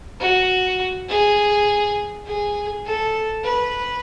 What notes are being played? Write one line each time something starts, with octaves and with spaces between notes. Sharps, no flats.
F#4
G#4
G#4
A4
B4